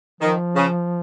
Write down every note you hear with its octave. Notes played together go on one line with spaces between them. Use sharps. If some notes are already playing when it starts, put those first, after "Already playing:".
D#3 F3
C#3